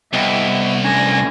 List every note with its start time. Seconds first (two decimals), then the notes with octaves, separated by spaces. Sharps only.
0.14 C2 B3 D#5 E5 G5
0.84 A3 C#4 D4 G#5 A#6